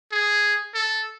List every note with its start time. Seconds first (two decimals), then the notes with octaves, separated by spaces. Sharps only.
0.12 G#4
0.74 A4